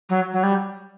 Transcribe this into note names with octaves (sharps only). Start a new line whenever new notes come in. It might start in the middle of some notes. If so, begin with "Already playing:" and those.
F#3
F#3
G3